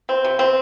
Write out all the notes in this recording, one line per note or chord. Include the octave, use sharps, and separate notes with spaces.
C4
C3
C4